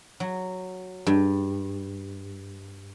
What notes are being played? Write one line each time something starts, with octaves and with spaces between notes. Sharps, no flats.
F#3
G2